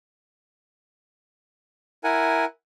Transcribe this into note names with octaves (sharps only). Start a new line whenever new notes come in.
E4 A#4 F#5 G#5